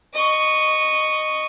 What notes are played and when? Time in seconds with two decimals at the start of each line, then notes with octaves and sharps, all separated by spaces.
0.14 D#5 C#6